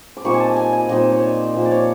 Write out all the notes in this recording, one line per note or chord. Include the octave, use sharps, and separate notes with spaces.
D6
A#2 G3 C4 D#4 C#6
G#5
A5
G#5
G#5
A#2 G3 C4 D#4 D#5
C#5
D5
A#2 F3 A#3
D5
C#5